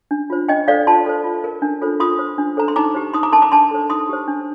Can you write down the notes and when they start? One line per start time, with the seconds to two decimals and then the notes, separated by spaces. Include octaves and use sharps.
0.11 D4
0.30 F4 C5
0.49 D4 D#5 G5
0.68 A4 C5 D5 F5
0.87 F4 A5 C6
1.06 A4 C5
1.24 F4
1.44 A#4
1.62 D4
1.81 F4 A4 C5
2.00 F4 C6 D#6
2.19 C5
2.38 D4
2.57 A4 C5 A#5
2.68 C6
2.76 D#4 A#5 D6
2.95 G4 C5
3.14 D#4 C6 D#6
3.23 A#5 D6
3.32 A#4 A5 C6
3.42 A#5 D6
3.52 D4 A5 C6
3.71 A4 C5
3.90 D#4 C6 D#6
4.09 G4 C5
4.28 D4